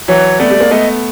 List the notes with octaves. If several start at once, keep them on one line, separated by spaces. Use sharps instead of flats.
E3 F#3 C#5
A3 B3 D5
G3 A3
G#3 A#3
A3 B3 D#5